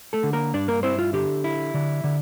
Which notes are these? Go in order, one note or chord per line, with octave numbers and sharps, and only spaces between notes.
A3 A4
D3
A#3 A#4
G2 D4 D5
A#3 A#4
C4 E4 C5
F4
D3 G4
E4
D3
D3